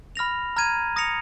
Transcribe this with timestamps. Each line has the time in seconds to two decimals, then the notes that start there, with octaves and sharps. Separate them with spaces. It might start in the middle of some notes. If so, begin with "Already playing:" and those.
0.16 B5 F6 A#6 F7
0.56 A#5 F6 G#6 D#7
0.96 D#6 A#6 C#7 F7